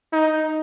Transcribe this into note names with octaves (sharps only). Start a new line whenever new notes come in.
D#4